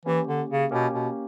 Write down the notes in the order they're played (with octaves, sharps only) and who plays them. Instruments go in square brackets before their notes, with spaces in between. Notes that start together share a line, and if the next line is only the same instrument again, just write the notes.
[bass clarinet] E3 [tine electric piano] A#3 C#4 G4
[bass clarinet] D3
C#3
[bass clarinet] B2 [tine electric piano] A#3 C#4 G4
[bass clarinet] B2